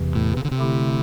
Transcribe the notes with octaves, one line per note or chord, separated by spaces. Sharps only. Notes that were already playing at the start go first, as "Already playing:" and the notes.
Already playing: E2 C3 E3
A2
C3
D3
C3
D3 A3 E4 G4